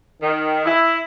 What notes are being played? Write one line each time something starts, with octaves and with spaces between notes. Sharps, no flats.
D#3
E4